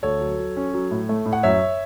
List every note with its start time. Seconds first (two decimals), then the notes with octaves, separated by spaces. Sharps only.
0.03 D2 A4 C#5
0.20 F#3
0.39 F#3
0.57 C#4
0.74 F#3
0.91 A2
1.09 A3
1.26 A2
1.33 F#5
1.43 F#2 C#5 E5